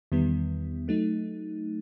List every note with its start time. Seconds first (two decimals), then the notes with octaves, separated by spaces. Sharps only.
0.12 E2 D#3 G3 B3
0.88 F#3 A3 D#4